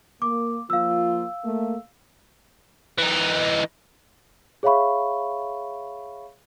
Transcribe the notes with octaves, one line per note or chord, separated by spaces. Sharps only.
A#3 D6
F3 A#3 F4 F5 E6
A3 A#3
E3 D#4
G#4 C#5 E5 F5 B5 C#6